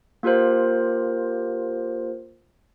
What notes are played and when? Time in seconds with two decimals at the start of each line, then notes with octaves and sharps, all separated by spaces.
0.23 A#3 F4 G4 A#4 C5